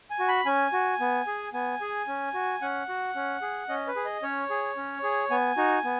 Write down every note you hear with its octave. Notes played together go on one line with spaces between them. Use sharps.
G#5
F#4
B5
C#4 G#5
F#4
B3
G#4
B3 G#5
G#4
C#4
F#4
C#4 F#5
F#4
C#4
G#4
C#4 D#5
B4
G#4
D#5
C#4 C#5
G#4
C#4
G#4
B3 G#5
D#4 F#4
B3